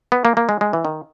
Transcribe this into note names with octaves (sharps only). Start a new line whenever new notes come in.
B3
A#3
A#3
G#3
G#3
E3
D#3